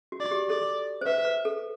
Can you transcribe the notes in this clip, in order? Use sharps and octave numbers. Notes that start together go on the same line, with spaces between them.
F#4
D5
G4
A4 D5
C5
B4 E5
B4
A4